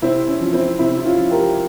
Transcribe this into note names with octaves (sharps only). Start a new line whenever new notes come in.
C3 C4 E4
C#4
F3
C4 E4
C3 C4 E4
E4
C#4 F4
F3
G4 A#4